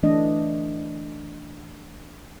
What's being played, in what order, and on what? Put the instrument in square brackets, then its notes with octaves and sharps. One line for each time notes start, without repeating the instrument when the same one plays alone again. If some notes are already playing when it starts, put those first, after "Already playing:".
[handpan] E3 A3 D4 D#5